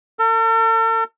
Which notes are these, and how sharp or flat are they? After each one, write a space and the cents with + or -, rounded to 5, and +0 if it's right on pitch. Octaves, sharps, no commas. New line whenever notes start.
A4 +45